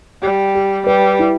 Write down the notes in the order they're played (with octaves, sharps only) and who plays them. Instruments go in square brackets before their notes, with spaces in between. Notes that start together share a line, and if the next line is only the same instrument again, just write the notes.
[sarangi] G3 [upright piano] G4
[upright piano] G4
[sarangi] G3 [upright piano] B4
[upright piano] E4